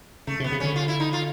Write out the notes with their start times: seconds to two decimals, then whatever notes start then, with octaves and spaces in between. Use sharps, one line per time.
0.27 C#3 A3
0.40 C3 B3
0.52 C#3
0.60 D3 C#4
0.76 F4
0.88 E4
1.00 D#4
1.13 F4